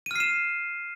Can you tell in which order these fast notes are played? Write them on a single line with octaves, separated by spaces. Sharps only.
D#7 F6 C7 E7